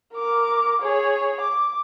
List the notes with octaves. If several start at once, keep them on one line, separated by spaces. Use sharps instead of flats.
A#4 D6
G#4 C#5
D6